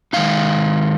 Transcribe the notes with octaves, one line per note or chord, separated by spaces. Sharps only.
D#3 G#3 D#4 F5